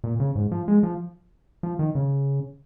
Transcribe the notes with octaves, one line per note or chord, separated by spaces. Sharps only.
A#2
C#3
G#2
F3
G#3
F3
F3
D#3
C#3